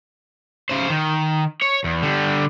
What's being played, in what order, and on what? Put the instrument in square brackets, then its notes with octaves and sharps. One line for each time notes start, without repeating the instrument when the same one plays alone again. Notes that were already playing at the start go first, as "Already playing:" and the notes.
[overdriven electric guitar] C#3 C5
D#3
C#5
E2
D3 G3